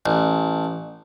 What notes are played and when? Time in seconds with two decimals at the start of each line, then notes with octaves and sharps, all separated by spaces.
0.06 A1